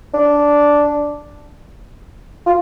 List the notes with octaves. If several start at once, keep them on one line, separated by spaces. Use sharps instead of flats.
D4
F4